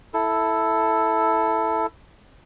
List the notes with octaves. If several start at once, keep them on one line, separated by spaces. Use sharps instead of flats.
E4 A4